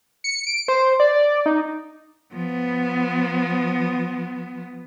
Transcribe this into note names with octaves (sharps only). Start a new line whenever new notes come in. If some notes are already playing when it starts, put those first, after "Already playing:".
C#7
D7
C5
D5
D#4
F3 B3